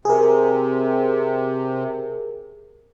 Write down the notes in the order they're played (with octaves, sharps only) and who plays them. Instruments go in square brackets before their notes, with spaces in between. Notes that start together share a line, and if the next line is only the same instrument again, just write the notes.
[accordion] C3 [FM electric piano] G#4 A#4